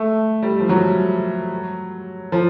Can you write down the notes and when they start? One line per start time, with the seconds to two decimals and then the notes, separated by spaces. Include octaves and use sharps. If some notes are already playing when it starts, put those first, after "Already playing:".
Already playing: A3
0.42 G3
0.60 F3
0.69 F#3
2.32 F3